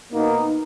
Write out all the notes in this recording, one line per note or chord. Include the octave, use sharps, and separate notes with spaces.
B2 A#3 B3 D#4